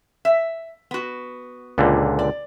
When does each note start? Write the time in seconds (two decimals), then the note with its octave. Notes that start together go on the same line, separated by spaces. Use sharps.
0.25 E5
0.91 B3 F#4
1.78 C#2 A#2 D3
2.19 D5